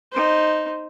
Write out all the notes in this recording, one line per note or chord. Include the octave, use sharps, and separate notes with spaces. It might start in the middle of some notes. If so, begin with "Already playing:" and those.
D#4 C5